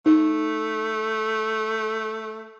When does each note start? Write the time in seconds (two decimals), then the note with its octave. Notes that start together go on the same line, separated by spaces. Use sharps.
0.06 A3 D#4